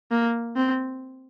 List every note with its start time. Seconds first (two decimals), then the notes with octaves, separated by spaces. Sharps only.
0.11 A#3
0.57 C4